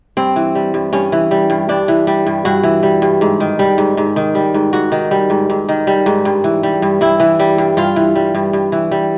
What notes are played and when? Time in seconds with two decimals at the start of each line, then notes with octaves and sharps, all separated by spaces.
0.17 G2 C4
0.36 E3
0.55 G3
0.74 G2
0.93 G2 C#4
1.12 E3
1.31 G3
1.50 G2
1.69 G2 D4
1.88 E3
2.07 G3
2.27 G2
2.45 G2 F#4
2.64 E3
2.83 G3
3.02 G2
3.21 G#2
3.40 D#3
3.59 G3
3.78 G#2
3.97 G#2
4.16 D#3
4.35 G3
4.54 G#2
4.73 G#2 F#4
4.92 D#3
5.11 G3
5.30 G#2
5.50 G#2
5.69 D#3
5.87 G3
6.06 G#2
6.25 G2
6.44 E3
6.63 G3
6.82 G2
7.01 G2 E4
7.20 E3
7.40 G3
7.58 G2
7.77 G2 F4
7.96 E3
8.16 G3
8.35 G2
8.53 G2
8.72 E3
8.91 G3